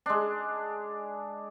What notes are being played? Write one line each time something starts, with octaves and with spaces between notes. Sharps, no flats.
G#3 D4